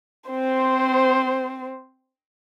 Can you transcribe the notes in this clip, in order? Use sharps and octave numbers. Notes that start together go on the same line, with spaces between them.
C4 C5